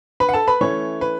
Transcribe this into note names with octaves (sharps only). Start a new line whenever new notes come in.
B4 B5
F#5
A4 A5
B4 B5
E3 A3 C#4 C#5
B4